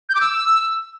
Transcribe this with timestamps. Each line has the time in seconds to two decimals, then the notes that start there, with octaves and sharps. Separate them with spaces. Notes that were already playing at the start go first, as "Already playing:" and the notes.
0.09 G6
0.15 D6
0.21 E6